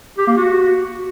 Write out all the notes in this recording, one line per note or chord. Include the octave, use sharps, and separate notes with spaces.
G4
A#3
F#4